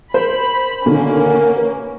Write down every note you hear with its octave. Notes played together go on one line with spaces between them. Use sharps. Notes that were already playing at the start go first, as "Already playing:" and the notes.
A#4 C5 B5
B2 D3 D#3 A#3 C#4
F#5
B4